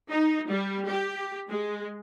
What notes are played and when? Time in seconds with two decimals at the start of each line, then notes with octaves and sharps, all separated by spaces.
0.10 D#4
0.50 G3
0.89 G4
1.50 G#3